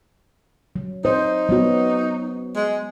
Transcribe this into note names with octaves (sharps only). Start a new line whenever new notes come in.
F#3
D#4 C5
F#3 B3 F#4
G#3